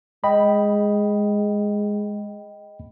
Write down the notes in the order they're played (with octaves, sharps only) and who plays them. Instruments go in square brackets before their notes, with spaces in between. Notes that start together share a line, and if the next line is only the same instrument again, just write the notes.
[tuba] G#3 [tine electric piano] D#5 G5 B5